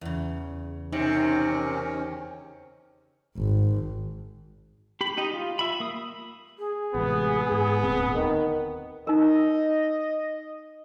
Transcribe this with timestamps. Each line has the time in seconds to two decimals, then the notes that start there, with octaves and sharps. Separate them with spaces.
0.01 E2 C#3
0.92 C3 D#3 C#4 D#4 A#6 C#7
3.37 G#1
5.01 G4 B5
5.17 D#4 G4 D#5
5.34 F4
5.59 E5 B5
5.80 A#3 D#6
6.58 G#4
6.94 A1 C3 G#3 B3
7.52 G#2
7.83 D#1 D2 C4
8.14 D#3
9.07 D#4 A#4 D#5